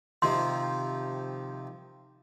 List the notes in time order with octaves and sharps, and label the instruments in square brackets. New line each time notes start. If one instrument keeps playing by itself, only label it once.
[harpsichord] C3 D#3 F3 [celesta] C6